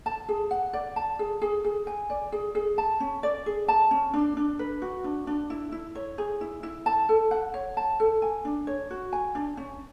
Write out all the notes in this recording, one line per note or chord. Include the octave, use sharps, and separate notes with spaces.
A5
G#4
F#5
D5
A5
G#4
G#4
G#4
G#5
D5
G#4
G#4
A5
C#4
D5
G#4
A5
C#4
D4
D4
B4
F#4
D4
D4
E4
E4
C#5
G#4
E4
E4
A5
A4
F#5
C#5
A5
A4
G#5
D4
C#5
F#4
G#5
D4
C#4